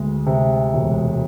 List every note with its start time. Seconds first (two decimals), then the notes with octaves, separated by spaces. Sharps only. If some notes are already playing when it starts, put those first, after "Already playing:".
Already playing: D2 G#3
0.26 C3
0.74 E1